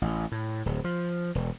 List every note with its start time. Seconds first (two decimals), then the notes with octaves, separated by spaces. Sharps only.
0.02 A1
0.32 A2
0.66 D1
0.84 F3
1.35 E1